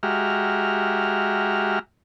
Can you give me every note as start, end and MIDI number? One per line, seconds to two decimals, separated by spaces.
0.03 1.79 56
0.03 1.79 66
0.03 1.79 67
0.03 1.79 76
0.03 1.79 82
0.03 1.79 89